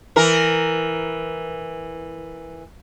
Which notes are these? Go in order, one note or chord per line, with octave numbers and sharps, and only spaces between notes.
E3 A#4